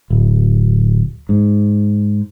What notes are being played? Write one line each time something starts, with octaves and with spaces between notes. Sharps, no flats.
D1
G#2